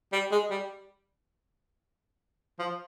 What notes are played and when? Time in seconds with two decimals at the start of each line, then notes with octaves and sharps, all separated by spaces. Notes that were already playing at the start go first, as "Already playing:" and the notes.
0.13 G3
0.31 G#3
0.50 G3
2.59 F3